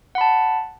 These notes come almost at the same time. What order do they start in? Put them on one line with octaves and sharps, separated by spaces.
F#5 B5 A5